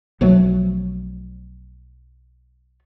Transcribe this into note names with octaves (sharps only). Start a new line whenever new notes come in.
B1 F3 F#3 A3